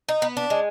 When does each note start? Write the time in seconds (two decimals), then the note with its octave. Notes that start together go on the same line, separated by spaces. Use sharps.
0.09 D#4
0.22 B3
0.37 D4
0.50 G#3